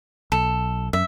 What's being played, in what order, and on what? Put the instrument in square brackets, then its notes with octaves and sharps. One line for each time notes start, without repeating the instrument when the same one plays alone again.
[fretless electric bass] B1 [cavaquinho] A4
[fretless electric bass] F#2 [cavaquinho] E5